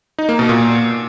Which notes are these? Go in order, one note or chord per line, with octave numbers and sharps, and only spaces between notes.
D#4
A#3
B2
A#2